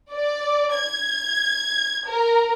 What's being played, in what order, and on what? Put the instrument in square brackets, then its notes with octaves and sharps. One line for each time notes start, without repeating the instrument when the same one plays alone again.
[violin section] D5
G#6
A#4